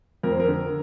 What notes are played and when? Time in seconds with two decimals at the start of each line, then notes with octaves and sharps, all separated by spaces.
0.23 F2 A#4
0.32 C5
0.40 A#4
0.48 D3